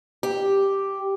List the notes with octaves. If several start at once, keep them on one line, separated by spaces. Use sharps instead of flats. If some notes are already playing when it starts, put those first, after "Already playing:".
G4